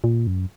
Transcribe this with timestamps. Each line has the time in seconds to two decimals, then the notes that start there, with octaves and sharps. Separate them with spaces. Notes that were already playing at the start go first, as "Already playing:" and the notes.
0.04 A#2
0.27 F#2